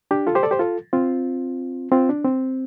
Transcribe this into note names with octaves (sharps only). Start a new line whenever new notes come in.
D4 G4
F4 A4
G4 C5
A4 D5
G4 C5
F4 A4
C4 F4
C4 F4
D4
C4